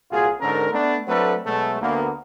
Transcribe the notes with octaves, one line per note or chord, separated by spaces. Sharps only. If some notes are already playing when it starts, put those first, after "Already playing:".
C2 A#2 F4 F#4 G#4
G#2 D3 C#4 A4 A#4
A3 B3 D4
F#3 A3 C4 D4 A4 B4
B2 F#3 G#3 A3
D2 A#3 B3